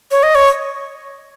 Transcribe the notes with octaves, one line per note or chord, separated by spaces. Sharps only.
C#5
D#5
C#5